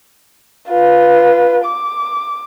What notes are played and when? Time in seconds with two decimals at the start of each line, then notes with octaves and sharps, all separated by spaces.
0.69 F4 B4
1.64 D6